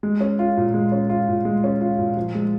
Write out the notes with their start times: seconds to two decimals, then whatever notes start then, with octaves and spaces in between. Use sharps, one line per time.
0.03 G#3
0.21 C#4
0.39 F4
0.57 A#2
0.74 G#3
0.92 C#4
1.09 F4
1.28 A#2
1.45 G#3
1.64 C#4
1.81 F4
1.99 A#2
2.17 F3
2.35 G#3